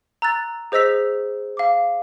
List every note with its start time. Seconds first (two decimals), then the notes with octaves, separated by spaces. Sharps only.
0.22 A#5 E6 F#6 A6
0.72 G#4 C5 D#5 E6 B6 F7
1.57 F5 D6